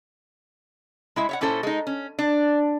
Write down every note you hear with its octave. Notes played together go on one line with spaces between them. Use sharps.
G#3 E4 E5
C#5 E5 F#5
A#2 C#4 E4 A4 C5
G#3 D#4
C#4
D4